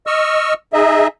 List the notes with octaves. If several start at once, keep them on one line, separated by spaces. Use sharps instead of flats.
D#5 C#6 E6 F6
D#4 G#4 D#5 E5